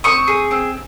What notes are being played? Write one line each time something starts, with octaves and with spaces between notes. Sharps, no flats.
C4 C#6 D#6
G#4
C4